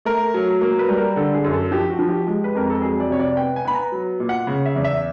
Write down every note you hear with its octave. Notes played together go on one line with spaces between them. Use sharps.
A3 A#4
F#3
A#3
B4
G3
A#4
D3 A4
G#4
F#2
A4
F3 G4
F#4
F3
G4
G#3 G4
B4
F2 A#4
A4
F#3 G#4
D5
C3 C#5
D5
B3 G5
G#5
B3 B5
A#5
F#3
A#2
F#5
C#3
E5
E2
E5